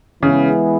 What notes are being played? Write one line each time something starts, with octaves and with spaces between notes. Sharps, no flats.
C#3 E3 G#3 B3 E4 G#4